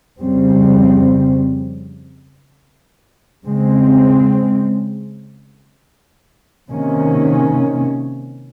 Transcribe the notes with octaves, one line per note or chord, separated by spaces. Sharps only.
F2 C#3 G3 C4
C#3 G#3 C4
C3 D#3 A#3 C#4